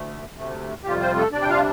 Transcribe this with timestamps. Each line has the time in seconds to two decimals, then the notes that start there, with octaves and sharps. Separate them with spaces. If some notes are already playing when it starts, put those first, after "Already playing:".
Already playing: D2 A3
0.36 D2 C3 A3
0.83 F2 C3 G3 F4 G4
1.00 C4 C5
1.16 A3 A4
1.32 C3 G3 D4 D5
1.42 G5
1.49 F4 F5